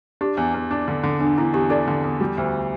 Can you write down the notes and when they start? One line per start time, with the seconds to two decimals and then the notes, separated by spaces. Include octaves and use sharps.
0.21 D4 G4
0.37 E2
0.54 E2
0.71 D4
0.88 D3
1.03 D3
1.20 E2 D4
1.38 E2 E4
1.54 E2 G4
1.70 D4 A4 D5
1.88 D3
2.04 E2
2.21 G3
2.38 D2